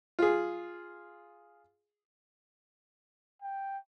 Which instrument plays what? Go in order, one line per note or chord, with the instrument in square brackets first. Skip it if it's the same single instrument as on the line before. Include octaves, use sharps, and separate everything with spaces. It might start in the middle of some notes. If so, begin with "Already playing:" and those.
[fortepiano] F4 G#4
[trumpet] G5